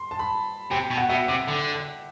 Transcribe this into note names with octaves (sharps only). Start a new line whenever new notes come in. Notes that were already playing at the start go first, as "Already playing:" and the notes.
Already playing: C6
A5
B5
C3 G5
B2
F#5
B2 E5
C3 D6
D3 D6
D6